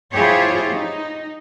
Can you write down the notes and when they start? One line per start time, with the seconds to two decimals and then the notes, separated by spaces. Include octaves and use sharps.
0.13 E4 F4 G4 G#4 C5 C#5
0.71 D#4